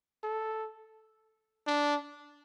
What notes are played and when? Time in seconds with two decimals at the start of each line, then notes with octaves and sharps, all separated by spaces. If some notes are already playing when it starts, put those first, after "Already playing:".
0.23 A4
1.67 D4